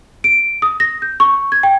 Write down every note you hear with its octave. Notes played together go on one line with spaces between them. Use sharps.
D7
D#6
A#6
G6
C#6
G#6
G5